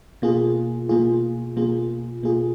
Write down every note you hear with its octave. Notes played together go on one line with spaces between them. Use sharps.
B2 A#3 F4 G#4
B2 A#3 F4 G#4
B2 A#3 F4 G#4
B2 A#3 F4 G#4